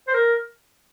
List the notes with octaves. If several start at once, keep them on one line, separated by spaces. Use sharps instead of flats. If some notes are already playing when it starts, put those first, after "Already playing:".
C5
A#4